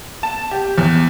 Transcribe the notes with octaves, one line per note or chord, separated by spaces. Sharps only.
A5
G4
E2